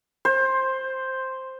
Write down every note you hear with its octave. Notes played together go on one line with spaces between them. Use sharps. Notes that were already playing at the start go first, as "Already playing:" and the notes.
C5